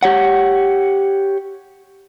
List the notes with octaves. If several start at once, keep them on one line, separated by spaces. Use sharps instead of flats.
G4 C#5 F#5